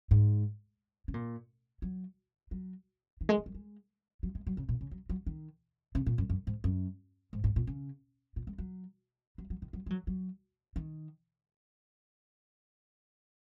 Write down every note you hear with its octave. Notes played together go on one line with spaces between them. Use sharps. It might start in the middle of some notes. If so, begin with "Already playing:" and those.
G#2
C#3
A#2
F#3
F#3
D#3
G#3
D#3
F#3
G#3
F#3
G#3
F#3
C#3
A#2
C#3
F#3
F#3
D#3
C#3
A#2
F#2
F#2
G#2
F#2
G#2
G#2
A#2
C#3
A#2
G#3
F#3
F#3
F#3
D#3
F#3
G#3
F#3
F#3
D#3